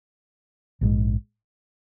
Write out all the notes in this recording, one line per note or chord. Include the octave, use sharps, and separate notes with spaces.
A#1 G#2 D#3 G#3